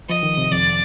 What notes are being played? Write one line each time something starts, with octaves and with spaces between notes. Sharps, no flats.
F3 D#5
D#3
C3
F2 D5